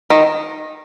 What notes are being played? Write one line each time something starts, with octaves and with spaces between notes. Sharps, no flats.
D#3